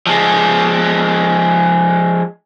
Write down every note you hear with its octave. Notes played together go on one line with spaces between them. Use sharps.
F3 G#3